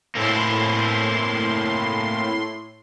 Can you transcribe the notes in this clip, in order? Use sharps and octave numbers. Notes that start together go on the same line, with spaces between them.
A2 A#3 C4 E4 C6